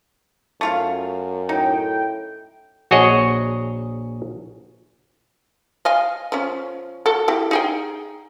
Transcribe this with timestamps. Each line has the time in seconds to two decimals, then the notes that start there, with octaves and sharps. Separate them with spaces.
0.61 F#2 A3 F4 F5
1.49 A2 D#4 G5
2.91 A#1 F#4 G#4 C#5 D#5
5.85 D#5 F5 G#5
6.32 F3 C#4
7.06 F#4 A4
7.28 E4 F#4 G4
7.51 D#4 G#4 G5